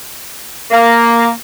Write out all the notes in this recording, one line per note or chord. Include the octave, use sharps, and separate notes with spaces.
A#3